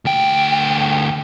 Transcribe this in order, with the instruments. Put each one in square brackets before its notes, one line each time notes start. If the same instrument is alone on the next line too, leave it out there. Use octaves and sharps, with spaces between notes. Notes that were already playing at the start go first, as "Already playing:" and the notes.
[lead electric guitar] D2 G5